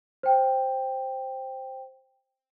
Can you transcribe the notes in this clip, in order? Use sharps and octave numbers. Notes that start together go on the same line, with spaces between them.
C5 G5